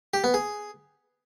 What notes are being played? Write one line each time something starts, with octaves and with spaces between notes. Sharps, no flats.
G4
B3
G#4